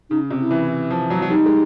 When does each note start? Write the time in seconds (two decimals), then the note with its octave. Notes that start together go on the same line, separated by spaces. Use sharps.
0.10 C#3 D#4
0.30 C3
0.41 E4
0.51 E3
0.91 F3
1.10 F#3
1.22 F#3
1.30 G3 D#4
1.46 G#3